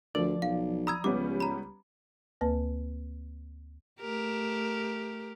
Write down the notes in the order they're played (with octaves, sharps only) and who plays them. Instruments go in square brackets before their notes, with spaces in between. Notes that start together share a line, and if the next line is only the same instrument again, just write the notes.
[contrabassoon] D2 [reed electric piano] F3 D5 [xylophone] A#4
[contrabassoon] B1 [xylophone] F5
[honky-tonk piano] A#5 D#6 [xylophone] B5 E6 G#6
[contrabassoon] C#2 [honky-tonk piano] G3 B3 C#4 [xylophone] D6
[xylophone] A#5 B5
[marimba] D2 A#3 B4 A5
[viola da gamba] A3 G4 A#4